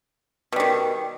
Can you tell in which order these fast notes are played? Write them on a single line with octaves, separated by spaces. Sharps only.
B2 G3 D#3